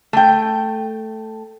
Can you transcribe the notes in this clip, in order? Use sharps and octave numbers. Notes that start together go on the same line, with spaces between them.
A3 G5